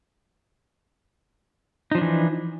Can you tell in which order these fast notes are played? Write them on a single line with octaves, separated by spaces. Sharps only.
D#4 F3 D4 E3